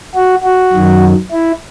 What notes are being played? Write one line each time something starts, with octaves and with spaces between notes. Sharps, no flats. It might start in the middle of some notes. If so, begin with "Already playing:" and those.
F#4
F#4
F#2 D#3 F#3
E4